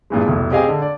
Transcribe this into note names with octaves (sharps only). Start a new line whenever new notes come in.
G2 A#2 E3 G#3
F1 C2 B2
C4 G4 G#4 D#5 F5 G#5
D3
D5